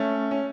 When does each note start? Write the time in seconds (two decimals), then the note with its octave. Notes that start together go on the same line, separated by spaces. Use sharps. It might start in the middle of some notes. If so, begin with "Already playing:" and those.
Already playing: A3 C#4
0.31 C#4